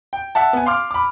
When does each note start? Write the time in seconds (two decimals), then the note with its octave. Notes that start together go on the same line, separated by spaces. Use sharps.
0.13 G5
0.35 E5 F#5 A5
0.53 B3 G#5
0.66 F5 C6 D6 F6
0.91 B5 D6